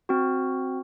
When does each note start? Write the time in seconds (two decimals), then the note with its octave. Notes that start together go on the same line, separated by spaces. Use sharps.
0.09 C4 F#4